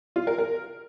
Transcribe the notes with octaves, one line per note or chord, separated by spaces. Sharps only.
F4
A#4
A#4